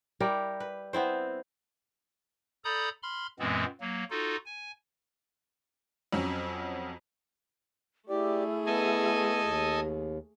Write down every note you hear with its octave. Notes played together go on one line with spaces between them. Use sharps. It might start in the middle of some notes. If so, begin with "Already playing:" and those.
G3 E4 G4 A#4
B4
B3 C4 E4 C5
A4 D5 A#5 B5 D#6 G6
B5 C6 F6
F#2 A#2 E3 G#3 B3 C4
F#3 A#3
D#4 F4 F#4 A4
G#5
F2 F#3 C#4 F#4
A3 E4 G4 G#4 D5
B3 A4 D#5 G#5
D#2